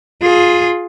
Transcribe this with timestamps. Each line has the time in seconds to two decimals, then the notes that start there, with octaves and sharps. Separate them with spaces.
0.22 F4 G#4